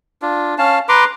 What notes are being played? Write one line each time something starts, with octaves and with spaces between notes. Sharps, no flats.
D4 F4
C#4 F5 A5
B4 A#5 C6 D6